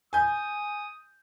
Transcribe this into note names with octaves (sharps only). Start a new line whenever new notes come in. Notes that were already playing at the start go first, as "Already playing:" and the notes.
G#5 D#6 G6